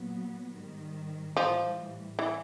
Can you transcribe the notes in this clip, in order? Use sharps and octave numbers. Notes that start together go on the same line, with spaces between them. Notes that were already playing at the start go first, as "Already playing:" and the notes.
Already playing: A#2 F#3 B3
G#2 D#3 G3
A2 E3 F3 G3
E3